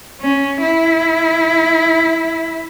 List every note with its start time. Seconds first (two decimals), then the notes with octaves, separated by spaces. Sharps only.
0.21 C#4
0.62 E4